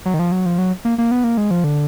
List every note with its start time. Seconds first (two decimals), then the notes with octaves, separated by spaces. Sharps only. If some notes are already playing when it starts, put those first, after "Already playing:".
0.06 F#3
0.14 D#3
0.19 F3
0.32 F#3
0.46 F3
0.58 F#3
0.85 A#3
0.98 A#3
1.11 B3
1.24 A#3
1.37 G#3
1.51 F3
1.64 D3